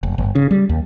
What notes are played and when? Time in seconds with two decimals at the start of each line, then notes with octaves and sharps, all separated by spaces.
0.03 F1
0.18 G1
0.35 C#3
0.51 G3
0.69 D#2